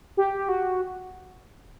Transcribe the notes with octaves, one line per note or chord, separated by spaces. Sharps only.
G4
F#4